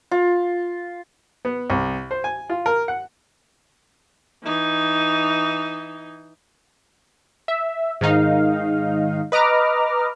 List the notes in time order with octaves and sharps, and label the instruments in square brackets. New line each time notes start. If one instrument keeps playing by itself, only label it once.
[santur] F4
[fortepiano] B3
C2
C5
G#5
F4
A#4
F#5
[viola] E3 D#4
[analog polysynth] E5
G#2 D#3 D#4 F5
B4 D#5 A#5 D6 F6